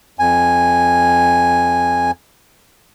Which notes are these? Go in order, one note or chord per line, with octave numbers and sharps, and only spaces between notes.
F2 G#5